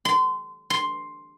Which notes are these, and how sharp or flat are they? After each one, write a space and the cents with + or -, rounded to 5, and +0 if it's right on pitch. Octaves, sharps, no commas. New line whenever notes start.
C6 -25
C6 +5